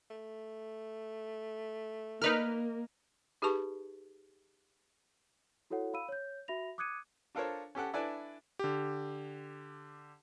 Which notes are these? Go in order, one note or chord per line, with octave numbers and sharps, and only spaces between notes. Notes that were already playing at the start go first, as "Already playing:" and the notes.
A3
A#3 D#4 A#4 B4 D#5 F6
D#4 G4 G#4 B4 A5 C#6
E4 F#4 A4 C#5 F#5
F5 B5 E6 D#7
C#5 G6
F#4 E5 B5 A#6 F7
D6 D#6 F#6 G#6 C#7 D#7
D4 F4 A4 A#4 C5 C#5
C#4 G4 A4 F#5
D4 E4 A4 B4 D5 G#5
D3 G4